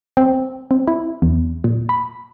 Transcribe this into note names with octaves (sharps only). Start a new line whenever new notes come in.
C4
C4
E4
E2
A#2
B5